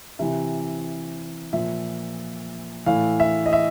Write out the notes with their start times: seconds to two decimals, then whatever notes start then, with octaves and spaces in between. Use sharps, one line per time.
0.19 C3 E3 E5
1.53 A#2 F3 E5
2.86 A2 E3 F5
3.20 E5
3.46 D#5
3.53 E5